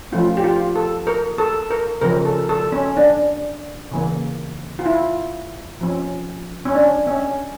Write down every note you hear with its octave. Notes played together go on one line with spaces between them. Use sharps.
F3 A3 C#4 F4
G4
F4
A4
A#4
A4
A#4
C#3 F3 C#4 A#4
A4
A4
C#4
D4
C#3 E3 A#3
F4
E4
F3 C#4
C#4
D4
C#4